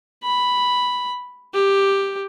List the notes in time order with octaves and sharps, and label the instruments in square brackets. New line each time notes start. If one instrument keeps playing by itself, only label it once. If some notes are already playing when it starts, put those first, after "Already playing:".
[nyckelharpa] B5
G4